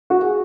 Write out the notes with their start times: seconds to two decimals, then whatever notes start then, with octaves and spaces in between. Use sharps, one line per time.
0.10 F#4
0.21 G#4